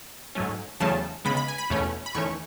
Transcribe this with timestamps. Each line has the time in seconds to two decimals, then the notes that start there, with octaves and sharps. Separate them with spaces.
0.35 G#2 F#3 A3 C#4
0.80 E2 C#3 F#3 A3 C#4 A5
1.25 C#3 G#3 B3 B5
1.37 B5
1.48 G#5
1.58 B5
1.70 E2 B2 A3 C#4
2.06 B5
2.15 E2 D#3 A3 C#4 C#6